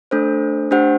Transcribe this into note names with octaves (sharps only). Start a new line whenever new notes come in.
A3 D4 A4 C5
A3 D4 G4 C5 F#5